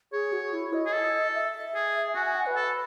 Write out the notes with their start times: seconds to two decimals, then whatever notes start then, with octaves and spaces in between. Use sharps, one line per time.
0.12 G#4 C#5
0.33 F#4
0.53 E4
0.73 D#5
0.86 G#4
0.93 A4
1.35 E5
1.75 G#4
2.15 F#4 G#5
2.26 G#5
2.36 F#5
2.46 B4
2.56 A4